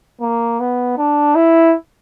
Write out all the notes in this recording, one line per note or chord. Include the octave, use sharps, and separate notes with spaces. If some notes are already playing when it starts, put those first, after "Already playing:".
A#3
B3
D4
E4